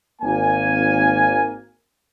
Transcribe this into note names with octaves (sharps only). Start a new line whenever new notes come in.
G#1 A#3 G#5